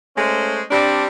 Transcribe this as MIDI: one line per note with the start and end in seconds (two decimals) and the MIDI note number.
0.17 0.61 56
0.17 0.61 57
0.17 0.61 61
0.17 0.61 72
0.71 1.06 55
0.71 1.06 60
0.71 1.06 62